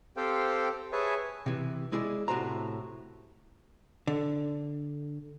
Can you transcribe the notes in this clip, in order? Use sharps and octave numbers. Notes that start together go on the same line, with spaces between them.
C4 G4 A4 C5 F5 G5
G#4 B4 C#5 E5 G#5 A5
C3 E3
G#3 E4 G#4 D5
A2 C3 F#4 C5 A#5
D3